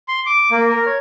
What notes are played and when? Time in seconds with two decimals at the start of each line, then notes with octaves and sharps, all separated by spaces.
0.08 C6
0.26 D6
0.51 A#3
0.70 A#4
0.86 C#5